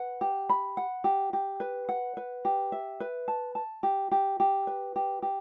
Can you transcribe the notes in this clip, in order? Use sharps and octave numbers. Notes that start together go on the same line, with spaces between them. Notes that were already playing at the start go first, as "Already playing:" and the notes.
Already playing: B4 F#5
G4
B5
F#5
G4
G4
B4
F#5
B4
G4
E5
B4
A5
A5
G4
G4
G4
B4
G4
G4